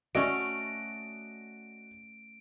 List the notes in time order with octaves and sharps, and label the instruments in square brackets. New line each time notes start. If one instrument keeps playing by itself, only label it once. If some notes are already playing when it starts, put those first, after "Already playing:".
[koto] A3 C#4 [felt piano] F#4 D5 D#5 [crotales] D7